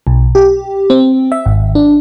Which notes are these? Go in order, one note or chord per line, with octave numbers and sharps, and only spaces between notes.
B1
G4
C4
E5
G#1
D4